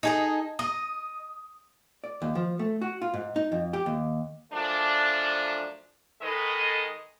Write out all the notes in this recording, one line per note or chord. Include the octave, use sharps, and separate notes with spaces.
D#4 G#4 A4 D#5
D#5 D#6
D5
D#2
F3
A3
F#4
F4
G#2
D#4
F2
G4
D#2
F#2 F3 A3 D4
D#3 G#3 A4 B4 D#5